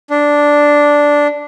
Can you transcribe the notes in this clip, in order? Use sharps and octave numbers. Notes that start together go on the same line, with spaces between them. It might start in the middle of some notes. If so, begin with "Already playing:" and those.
D4